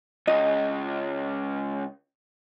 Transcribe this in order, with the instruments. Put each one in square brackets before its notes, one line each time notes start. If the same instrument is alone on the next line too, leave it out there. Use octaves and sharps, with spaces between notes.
[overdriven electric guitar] C#2 [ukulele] D#5